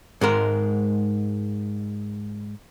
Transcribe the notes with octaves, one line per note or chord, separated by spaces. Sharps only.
G#2 G#3 A#4